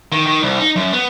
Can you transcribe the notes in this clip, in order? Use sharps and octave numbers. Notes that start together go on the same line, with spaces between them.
D#3
D#3
C2
D#4
F#2
B3